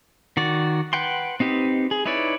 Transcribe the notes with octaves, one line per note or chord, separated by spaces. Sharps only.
D#3 F#4 D5
B4 F#5 G5 C6
C4 D#4 G4 B4
G#4
D#4 E4 B4 C#5 D5